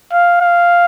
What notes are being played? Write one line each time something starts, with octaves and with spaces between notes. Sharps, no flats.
F5
F5